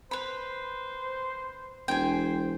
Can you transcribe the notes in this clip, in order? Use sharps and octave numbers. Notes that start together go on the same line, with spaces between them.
B4 C5 B5
E1 C5 G5 G#5